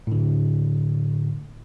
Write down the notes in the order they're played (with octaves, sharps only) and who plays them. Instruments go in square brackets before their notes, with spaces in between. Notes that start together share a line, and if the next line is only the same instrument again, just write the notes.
[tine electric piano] A2 D3